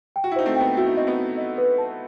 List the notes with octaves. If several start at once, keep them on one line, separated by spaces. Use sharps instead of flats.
G5
F#4
E4
D#4 C5
A3 C4
B3 G5
E4 F#4
D#4
C4 D#5
B3 D#4
F#4
D#5
B4
A5